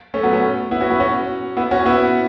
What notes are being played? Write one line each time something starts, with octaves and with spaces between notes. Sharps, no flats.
A3 C#4
F#3 B3
A3 C#4
B3 E4
C#4 F#4
B3 E4
C#4 F#4
B3 E4
C#4 F#4
B3 E4